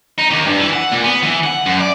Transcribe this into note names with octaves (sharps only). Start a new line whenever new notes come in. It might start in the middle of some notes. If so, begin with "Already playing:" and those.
D#4
D#2
G2
E3
F#5
A#2
B3
E3
F#5
F#2
D5